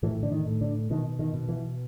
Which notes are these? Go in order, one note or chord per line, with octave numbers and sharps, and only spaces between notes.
A2 E3
D3
D#3
A2
D3
B2 D#3
D#3
B2
E3